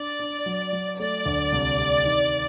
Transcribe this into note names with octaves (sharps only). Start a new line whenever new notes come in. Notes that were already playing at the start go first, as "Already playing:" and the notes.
Already playing: D4 D5
D4
F#3
F#3
A3 D5
D2
C2
C3
D#3